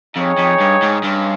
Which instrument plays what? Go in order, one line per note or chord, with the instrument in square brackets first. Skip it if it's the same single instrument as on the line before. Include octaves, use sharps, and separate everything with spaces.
[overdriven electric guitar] F2 [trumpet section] D#4 G#4 C#5 G5
[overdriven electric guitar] F2
G2
G#2
[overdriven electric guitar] G2 [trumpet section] G#3 C#4